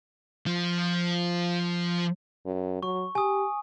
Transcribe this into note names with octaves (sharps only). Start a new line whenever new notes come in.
F3 F4
F#2
F#3 C#6
G4 G#5 D#6